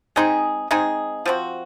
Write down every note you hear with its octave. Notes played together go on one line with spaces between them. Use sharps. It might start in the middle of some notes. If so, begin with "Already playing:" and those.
G#3 C4 D#4 G#4
G#3 C4 D#4 G#4
F3 C4 F#4